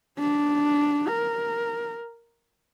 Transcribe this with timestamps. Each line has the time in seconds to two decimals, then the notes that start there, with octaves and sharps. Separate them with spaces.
0.19 D4
1.08 A#4